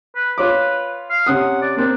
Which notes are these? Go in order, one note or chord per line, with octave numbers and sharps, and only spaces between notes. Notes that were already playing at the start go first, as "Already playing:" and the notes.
B4
F4 B4 C#5 D6
F5
C3 C#4 F#5 D#6
D5
A#3 C4 D4